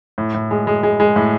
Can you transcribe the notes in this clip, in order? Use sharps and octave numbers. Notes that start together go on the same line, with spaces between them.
A2
A2
G#3
G#3
G#3
G#3
A2